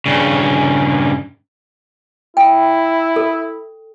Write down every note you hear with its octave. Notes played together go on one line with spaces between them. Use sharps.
G2 C#3
E4 G5
A4